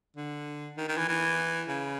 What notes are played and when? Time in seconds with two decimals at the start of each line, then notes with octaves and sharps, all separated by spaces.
0.17 D3
0.77 D#3
0.88 D#3
0.97 E3
1.08 E3
1.69 C#3